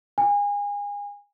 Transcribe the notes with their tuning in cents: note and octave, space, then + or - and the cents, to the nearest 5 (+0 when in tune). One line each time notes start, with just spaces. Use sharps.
G#5 -30